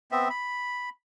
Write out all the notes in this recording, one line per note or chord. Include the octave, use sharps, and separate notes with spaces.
B3 C4 E5
B5